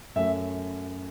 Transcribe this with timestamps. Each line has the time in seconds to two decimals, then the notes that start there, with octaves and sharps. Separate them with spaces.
0.16 F#2 F#3 A3 E5